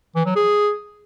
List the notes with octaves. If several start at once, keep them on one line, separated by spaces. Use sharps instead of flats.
E3
F#3
G#4